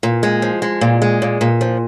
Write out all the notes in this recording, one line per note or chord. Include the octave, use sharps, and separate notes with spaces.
A#2
G#3
F3
G#3
A#2
G#3
A#2
A#2
F3